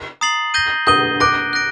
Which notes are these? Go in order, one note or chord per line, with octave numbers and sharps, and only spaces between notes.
A#5 D#6 A6 C7 F#7
G6 A#6 D#7 G7
D#6 G6 A#6 D#7 G7
D6 F#6 A#6 D7
F#6 A#6 D7